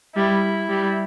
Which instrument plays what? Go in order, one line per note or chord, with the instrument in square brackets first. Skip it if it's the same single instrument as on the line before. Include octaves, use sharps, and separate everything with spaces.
[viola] G3 [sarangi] E4
[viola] G3